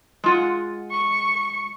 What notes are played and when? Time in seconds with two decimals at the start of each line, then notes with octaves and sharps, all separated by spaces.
0.24 G#3 F4 F#5
0.91 C#6